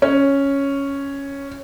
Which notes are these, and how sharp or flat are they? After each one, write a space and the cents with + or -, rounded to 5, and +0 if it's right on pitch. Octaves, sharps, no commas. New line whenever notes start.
C#4 +0